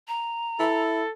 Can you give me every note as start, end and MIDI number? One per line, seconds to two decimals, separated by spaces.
0.08 0.82 82
0.59 1.04 64
0.59 1.10 69